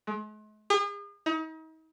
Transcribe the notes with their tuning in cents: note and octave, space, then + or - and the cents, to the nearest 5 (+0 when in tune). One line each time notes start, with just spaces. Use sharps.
G#3 +45
G#4 -40
D#4 +40